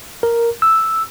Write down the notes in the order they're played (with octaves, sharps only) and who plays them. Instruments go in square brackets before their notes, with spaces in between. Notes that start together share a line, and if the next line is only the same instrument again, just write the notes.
[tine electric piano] A#4
E6